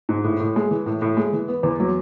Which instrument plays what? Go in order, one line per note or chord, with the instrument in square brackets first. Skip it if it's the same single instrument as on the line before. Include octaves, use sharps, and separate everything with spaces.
[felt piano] G#2
A2
A2
G#3
E3
A2
A2
G#3
E3
B3
E2
F#3